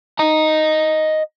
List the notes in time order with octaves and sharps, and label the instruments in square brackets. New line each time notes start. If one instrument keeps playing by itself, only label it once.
[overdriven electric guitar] D#5 A#5